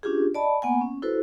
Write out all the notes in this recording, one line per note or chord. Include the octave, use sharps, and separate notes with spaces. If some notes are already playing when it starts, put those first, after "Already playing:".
C#4 D4 F4 G4 G#4
D5 D#5 A5 B5
A#3 B3 F#5 G#5
C#4
E4 F#4 A4 B4 C5